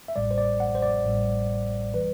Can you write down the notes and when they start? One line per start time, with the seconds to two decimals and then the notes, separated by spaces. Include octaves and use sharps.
0.08 E5
0.16 A1 A2 G3 D5
0.31 C5
0.38 D5
0.60 F#5
0.75 C5
0.82 D5
1.05 A1 A2 G3
1.94 E3 G3 B4